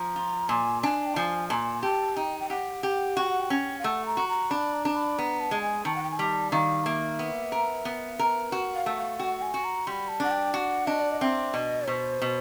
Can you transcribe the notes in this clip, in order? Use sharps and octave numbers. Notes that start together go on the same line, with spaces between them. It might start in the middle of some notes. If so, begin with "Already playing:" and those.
Already playing: F3 A#5
F4
A#2 G#5
D4 G#5
G5
F3 G#5
A#2 G#5 A5
G4 A5
D#4 G5
G5
G4 F#5
G4
F#4 G5
F#5
G5
C#4
F5
A3 F#5
A#5
F#4
A#5
D4 B5
A#5
D4
B5
B3 A#5
A5
G#3
G#5
D#3 A5
F#5
G5
G#5
G3 A5
D#3 F5
A#3 E5
B3
A#4
B3
A#4
F#4
F5
A3
F5
F#4 F#5 G5
G#5
F#4
A#5
G3 B5 C6
A5
D4 F#5
G5
F#4 F#5 G5
D4 D#5
D5
D#5
C4 E5
B2 D#5
B2 C5
B2